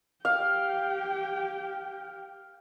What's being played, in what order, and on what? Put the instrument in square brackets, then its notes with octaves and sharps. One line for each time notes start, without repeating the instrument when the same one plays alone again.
[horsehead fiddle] G4 G5 [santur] F5